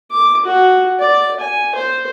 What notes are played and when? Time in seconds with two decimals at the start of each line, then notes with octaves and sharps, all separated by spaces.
0.11 D6
0.45 F#4
1.00 D5
1.40 G#5
1.75 C5